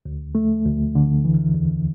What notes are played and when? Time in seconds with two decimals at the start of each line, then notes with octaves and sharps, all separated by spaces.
0.06 D2
0.35 A3
0.65 D2
0.95 D3
1.25 E3
1.54 E2